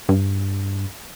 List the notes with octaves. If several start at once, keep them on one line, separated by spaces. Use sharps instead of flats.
G2